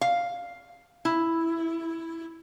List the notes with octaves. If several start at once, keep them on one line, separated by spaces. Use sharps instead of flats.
F5
E4